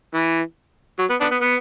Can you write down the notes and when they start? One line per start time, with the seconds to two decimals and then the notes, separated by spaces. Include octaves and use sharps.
0.14 E3
0.99 F#3
1.10 B3
1.21 B3 D4
1.31 B3
1.41 B3